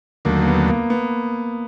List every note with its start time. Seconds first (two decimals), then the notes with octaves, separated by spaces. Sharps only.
0.25 D#2 D3 F#3 A3 A#3
0.42 A#3
0.47 B3
0.68 A#3
0.90 B3